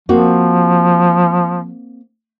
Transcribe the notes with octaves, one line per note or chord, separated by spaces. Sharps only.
F3 A#3 C4 F#4